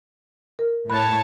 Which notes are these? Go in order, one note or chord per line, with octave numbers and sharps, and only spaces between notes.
A#4
A2 C#5 A5 B5 F#6